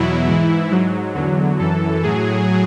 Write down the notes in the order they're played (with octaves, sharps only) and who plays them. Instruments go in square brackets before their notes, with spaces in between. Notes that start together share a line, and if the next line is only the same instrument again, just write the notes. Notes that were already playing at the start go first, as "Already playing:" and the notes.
Already playing: [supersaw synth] E2 B2 F#3 E4
G#2 E3
G#2 F#3
E2 D3 F#3
F#2 E3 A4
A2 F#3 G#4